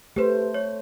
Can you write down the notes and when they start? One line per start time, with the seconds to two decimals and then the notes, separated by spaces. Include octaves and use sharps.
0.16 A3 G4 B4 C5
0.54 C#5